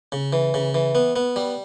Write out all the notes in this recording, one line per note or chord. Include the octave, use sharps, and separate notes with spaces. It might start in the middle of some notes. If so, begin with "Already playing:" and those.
C#3
E3
C#3
E3
B3
B3
G3